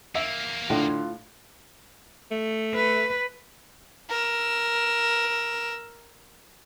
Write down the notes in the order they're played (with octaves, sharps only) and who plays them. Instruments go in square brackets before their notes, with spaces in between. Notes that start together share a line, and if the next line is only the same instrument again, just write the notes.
[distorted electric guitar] E2 A#3 [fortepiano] E5
[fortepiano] A2 [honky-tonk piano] D3 [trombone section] F4
[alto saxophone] A3
[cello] B4
[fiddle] A#4 E6